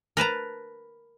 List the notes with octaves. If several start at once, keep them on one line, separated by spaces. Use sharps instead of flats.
A#4 B4 A5 A#5